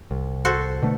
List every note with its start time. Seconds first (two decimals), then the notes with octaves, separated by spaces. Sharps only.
0.11 C2
0.45 F#4 A4 C5
0.82 B2 D3 A3